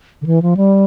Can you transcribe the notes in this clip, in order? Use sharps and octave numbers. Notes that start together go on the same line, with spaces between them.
D3
E3
F3
G3